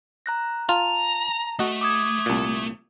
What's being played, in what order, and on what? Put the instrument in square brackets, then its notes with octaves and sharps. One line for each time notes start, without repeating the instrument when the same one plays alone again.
[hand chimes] A#5 F#6 A#6
[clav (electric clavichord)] F4 [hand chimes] A5 [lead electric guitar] A#5
[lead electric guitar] A3 [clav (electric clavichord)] F#4 D#5
[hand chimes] D6 D#6 G#6
[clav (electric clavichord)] C2 A#2